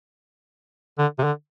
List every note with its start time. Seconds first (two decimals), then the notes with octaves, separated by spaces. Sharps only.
0.99 D3
1.19 C3
1.24 D3